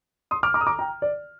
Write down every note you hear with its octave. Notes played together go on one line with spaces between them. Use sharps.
C6 D#6
D6 F6
A#5 D6
D#6
A#5 D6
G5 A#5
D5